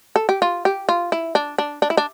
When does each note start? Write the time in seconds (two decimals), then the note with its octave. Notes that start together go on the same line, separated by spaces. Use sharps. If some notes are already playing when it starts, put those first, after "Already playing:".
0.16 A4
0.29 G4
0.42 F4
0.65 G4
0.89 F4
1.12 E4
1.35 D4
1.58 D4
1.82 D4
1.90 E4
1.97 D4